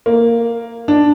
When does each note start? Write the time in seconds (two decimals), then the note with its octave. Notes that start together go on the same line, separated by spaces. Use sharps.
0.06 A#3
0.88 D4